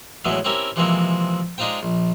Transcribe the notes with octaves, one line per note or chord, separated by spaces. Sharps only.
E2 A2 E3 F#3 G#3 B3
C4 C#4 E4 G4 A#4
C3 E3 F3 G#3 A#3 C4
G#3 D4 D#4 F4 C5 G5
A#1